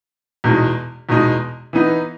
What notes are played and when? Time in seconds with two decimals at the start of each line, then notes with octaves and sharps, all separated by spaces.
0.44 E2 B2 G#3 D#4
1.09 E2 B2 G#3 D#4
1.73 E3 B3 D#4